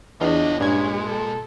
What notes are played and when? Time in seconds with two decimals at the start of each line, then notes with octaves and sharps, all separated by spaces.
0.21 E2 D4 F4 C#5 D#5
0.60 G2 A#2 G#3 C#4 G#6
1.07 A4